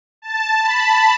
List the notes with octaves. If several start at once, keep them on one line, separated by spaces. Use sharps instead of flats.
A5
B5